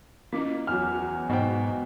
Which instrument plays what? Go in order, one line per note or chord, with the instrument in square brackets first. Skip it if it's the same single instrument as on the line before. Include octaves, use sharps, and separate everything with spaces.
[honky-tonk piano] A#3 [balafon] C#4 E4 D#5
[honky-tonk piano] E2 F#3 [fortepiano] F6
[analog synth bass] G#2 [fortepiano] B2 G5 [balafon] G#4 C5